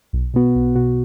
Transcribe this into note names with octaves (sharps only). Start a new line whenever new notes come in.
B1
B2 B3 F#4
B1
B2 B3 F#4